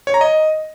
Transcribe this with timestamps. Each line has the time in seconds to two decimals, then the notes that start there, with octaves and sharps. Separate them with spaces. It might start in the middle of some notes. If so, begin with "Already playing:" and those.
0.07 C#5
0.14 A#5
0.21 D#5